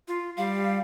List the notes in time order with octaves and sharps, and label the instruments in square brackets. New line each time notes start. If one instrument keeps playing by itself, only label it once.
[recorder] F4
[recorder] G3 [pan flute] F5